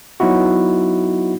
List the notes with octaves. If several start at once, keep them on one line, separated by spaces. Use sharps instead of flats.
F#3 B3 D#4 E4 F#4